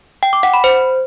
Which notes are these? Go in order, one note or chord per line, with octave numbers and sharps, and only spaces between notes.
G5
D6
F#5
B5
C5